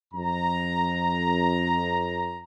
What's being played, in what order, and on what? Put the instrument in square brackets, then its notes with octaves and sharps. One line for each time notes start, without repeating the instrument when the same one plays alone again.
[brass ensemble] F2 A#5